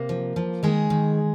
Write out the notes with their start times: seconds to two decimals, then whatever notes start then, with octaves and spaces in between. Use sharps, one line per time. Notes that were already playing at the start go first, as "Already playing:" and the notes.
Already playing: C3 A#3
0.09 F3
0.36 F3
0.63 D#3 G#3 G#4
0.90 D#3